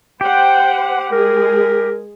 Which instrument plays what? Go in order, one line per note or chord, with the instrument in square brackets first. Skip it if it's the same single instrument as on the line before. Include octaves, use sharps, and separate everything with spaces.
[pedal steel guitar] G4 [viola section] C5 F#5 [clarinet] G5
[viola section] G#3 G#4 [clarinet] A#4